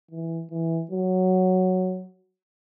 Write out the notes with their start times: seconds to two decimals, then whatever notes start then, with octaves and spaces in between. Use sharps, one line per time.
0.11 E3
0.51 E3
0.91 F#3